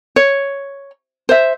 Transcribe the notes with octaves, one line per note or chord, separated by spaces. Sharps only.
C#5
C5 E5